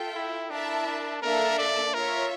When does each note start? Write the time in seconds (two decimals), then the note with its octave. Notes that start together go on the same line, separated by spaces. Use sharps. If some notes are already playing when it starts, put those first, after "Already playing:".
Already playing: F4 A4 E5 G5
0.15 E4
0.50 D4 E4 A#4 E5 A5
0.86 D4
1.22 A#3 D4 A4 A#4 E5 A5
1.59 D5
1.94 F4 A#4 C#5 E5